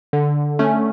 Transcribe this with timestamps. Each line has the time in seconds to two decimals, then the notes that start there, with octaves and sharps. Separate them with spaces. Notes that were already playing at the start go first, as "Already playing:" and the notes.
0.13 D3
0.59 A3 C#4